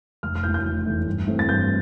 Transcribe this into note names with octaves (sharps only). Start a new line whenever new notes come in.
F1 F6
F6
E2 E3 A3 G6
G6
F1
E2 E3 A3
G2
E3 A3 C4
A6
G2 G6